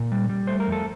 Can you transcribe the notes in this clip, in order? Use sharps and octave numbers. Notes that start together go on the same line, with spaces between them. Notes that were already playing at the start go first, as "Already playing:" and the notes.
Already playing: A#2
G3
G3
A3 C5
A#4
F2
A4